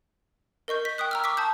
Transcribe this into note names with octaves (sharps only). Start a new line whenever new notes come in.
A#4 D#5 C#6 G6
B6
G5 C#6 D#6 F#6
A#5 E6 F6
C#6 D6 E6 B6
A5 D#6 G6